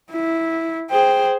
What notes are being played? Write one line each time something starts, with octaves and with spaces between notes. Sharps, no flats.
E4
G#4 C5 G5